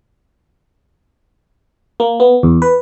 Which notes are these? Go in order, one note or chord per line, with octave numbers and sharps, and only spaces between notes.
A#3
B3
E2
B4